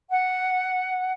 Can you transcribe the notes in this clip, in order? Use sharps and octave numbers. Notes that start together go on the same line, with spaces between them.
F#5